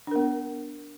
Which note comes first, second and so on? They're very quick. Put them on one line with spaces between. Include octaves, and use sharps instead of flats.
D4 A#4 B3